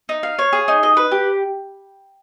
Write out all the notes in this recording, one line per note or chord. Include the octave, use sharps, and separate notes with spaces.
D#4
F5
C#5
G#4
D#4
D#5
B4
G4